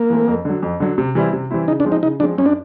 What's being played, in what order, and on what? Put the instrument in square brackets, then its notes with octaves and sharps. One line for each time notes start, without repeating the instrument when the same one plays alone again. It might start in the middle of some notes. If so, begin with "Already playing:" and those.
Already playing: [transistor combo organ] A#3
[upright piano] E3 A3 C4
F2
D3 F#3
F2
D3 F#3
C3
E3 G3 C4 E4
C3
E3 G3 C4 E4
[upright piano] C#3 [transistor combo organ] D#4
[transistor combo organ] D4
[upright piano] F3 G#3 C4
[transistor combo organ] D#4
[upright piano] C#3 [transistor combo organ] D#4
[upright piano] F3 G#3 C4 [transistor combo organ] D4
[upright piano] F#2 [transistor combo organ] C#4
[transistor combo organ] D4